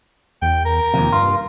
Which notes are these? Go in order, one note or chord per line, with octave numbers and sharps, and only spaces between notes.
E2 G5
A#4
D#2 C3 F3
G2 F4